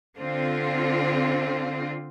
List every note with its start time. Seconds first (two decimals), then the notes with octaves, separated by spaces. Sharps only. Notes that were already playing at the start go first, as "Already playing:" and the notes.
0.18 D3 C4 F4